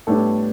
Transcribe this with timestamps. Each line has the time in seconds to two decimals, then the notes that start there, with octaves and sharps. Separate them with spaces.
0.07 A2 G3 B3 D4 A4